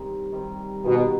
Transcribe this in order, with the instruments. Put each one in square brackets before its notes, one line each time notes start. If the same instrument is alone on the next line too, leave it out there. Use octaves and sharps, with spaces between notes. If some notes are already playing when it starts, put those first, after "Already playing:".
Already playing: [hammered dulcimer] D#3 G3 C4
D#3 G3 C4
[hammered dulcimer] G2 D#3 B3 [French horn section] B2